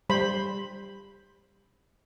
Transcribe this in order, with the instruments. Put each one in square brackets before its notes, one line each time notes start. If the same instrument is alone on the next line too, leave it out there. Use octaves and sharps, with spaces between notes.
[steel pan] G3 C5 B5